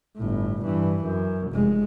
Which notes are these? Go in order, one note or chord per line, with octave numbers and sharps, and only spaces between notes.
G1 A2
G2 E3
F#2
F1 G#3